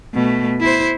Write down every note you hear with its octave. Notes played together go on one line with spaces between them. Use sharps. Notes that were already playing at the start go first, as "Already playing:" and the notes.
B2 A3
E4 C5